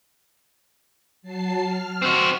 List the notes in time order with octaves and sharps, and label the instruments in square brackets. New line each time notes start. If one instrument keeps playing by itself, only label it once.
[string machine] F#3 A5 C7
F6
[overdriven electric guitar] C4 F#4